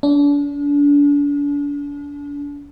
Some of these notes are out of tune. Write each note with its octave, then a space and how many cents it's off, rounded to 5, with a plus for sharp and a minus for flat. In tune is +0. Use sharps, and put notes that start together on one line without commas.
D4 -35